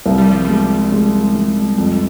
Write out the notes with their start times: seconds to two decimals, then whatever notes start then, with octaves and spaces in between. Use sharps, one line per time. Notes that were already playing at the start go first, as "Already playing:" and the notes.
0.06 C2
0.18 G3
0.31 F3
0.45 G3 G#3
0.92 G#3
1.35 G#3
1.78 F2